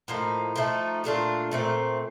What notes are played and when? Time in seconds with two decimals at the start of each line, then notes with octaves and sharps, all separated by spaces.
0.08 A2 F3 A#3 D#4
0.56 F3 A3 D#4
1.04 A#2 A3 D4 F4
1.51 A#2 A3 C4